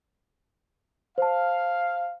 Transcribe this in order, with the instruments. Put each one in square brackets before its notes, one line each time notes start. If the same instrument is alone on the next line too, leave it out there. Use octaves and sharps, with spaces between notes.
[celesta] C5 A5 [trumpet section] F5